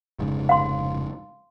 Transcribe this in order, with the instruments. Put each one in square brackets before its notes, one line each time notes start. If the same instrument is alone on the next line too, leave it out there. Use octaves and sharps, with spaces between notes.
[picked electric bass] F1 G#2 C#3
[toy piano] F5 C6